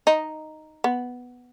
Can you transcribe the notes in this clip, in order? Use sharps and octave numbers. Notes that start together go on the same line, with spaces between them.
D#4
B3